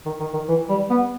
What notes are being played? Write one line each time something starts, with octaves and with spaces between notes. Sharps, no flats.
D#3
D#3
D#3
E3
G3
B3